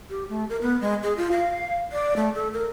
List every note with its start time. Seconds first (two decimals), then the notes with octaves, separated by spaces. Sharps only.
0.10 G4
0.29 A3
0.49 A#4
0.62 B3
0.81 G#3
1.03 G#4
1.17 F4
1.32 F5
1.93 D5
2.16 A3
2.35 A4
2.54 A#4